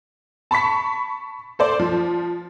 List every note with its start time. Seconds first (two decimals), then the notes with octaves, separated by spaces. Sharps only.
0.51 A5 B5 C#6 B6
1.59 A4 C5 D5
1.80 F3